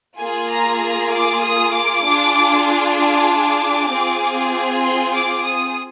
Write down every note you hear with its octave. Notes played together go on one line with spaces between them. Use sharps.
A#3 F4 G#4 G#5
A#5
A#5
D6
D#6
D6
D4 F4 G#4
D6
C4 F4 G#4
C6
D6
D#6